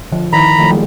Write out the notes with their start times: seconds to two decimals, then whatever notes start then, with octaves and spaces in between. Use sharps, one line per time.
0.12 D3 F3
0.33 D#3 E4 A#5 B5
0.58 D#3 F3 A3
0.71 G3 G#3 A#3